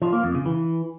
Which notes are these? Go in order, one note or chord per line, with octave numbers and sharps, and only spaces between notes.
F3
A#3
F2
C#3
E3